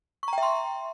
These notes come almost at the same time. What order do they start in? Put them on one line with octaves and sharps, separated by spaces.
C#6 A#5 G5 E5 C6